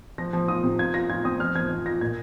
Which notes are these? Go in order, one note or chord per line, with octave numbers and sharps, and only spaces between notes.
F3 A#6
F3
F4 D#6
C3
F4 G#6
F4 A#6
F4 G#6
C4 D#6
F3 F6
F3 G#6
F3
F4 A#6
A#2 G#6